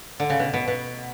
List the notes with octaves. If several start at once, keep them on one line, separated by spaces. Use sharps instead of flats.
D3
C#3
B2
B2
B2